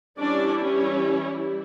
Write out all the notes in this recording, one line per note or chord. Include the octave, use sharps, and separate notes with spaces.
E3 G3 C#4 D4 E4 D5
C#4 C#5